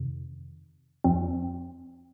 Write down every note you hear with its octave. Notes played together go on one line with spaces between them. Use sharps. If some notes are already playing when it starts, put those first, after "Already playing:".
Already playing: F2 C3 D#3
F2 F3 C4